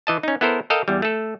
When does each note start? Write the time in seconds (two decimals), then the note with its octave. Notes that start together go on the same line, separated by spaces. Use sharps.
0.07 E3 D#5 A5
0.23 C#4 D#4
0.41 B3 E4 A4 A#4 C5
0.70 A4 A#4 D#5 F5 G5
0.88 E2 G3
1.02 A3 A4